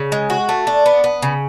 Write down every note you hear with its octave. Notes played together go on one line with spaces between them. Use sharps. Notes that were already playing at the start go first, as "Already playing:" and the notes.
Already playing: C#3
G#3
F#4
A3
D4
B3
B3
C#3